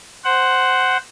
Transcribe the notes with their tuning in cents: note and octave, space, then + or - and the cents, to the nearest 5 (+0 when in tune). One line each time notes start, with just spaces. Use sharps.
C5 +0 F#5 +10